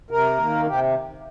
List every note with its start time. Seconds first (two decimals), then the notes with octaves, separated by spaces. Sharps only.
0.10 C3 A#4
0.39 D#3 A#3
0.67 C3 G4